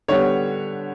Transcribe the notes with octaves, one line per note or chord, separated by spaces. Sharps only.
D3 G3 B3 C#5